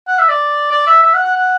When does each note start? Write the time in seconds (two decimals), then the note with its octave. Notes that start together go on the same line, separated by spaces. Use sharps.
0.08 F#5
0.18 E5
0.29 D5
0.71 D5
0.87 E5
1.03 E5
1.14 F#5
1.24 F#5
1.34 F#5